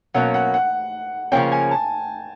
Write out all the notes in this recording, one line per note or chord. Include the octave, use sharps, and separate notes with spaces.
B2 F#3 A#3 C#4 F#5
F#5
F#5
C#3 F3 A#3 C#4 G5
G#5
A5